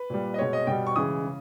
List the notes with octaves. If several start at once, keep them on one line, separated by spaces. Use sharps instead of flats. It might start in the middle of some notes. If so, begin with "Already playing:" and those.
Already playing: B4
A#2 G3
D#5
B2 G#3 C#5
D#5
B2 G3 G5
C#6
C#3 E3 G#3 D#6
C#3